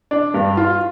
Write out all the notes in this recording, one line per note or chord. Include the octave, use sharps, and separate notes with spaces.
D4
G2
F4